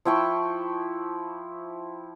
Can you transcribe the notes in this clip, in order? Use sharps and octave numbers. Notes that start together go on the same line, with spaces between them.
F3 E4 G5 C#6